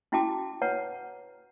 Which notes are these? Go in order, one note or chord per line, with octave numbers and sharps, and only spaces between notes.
C#4 E4 F#4 G5 A5 D6
B4 C#5 F#5 A#5